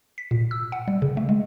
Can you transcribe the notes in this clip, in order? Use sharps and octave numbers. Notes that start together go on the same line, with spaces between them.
B6
A#2
E6
F#5
G3
C#3
A3
G#3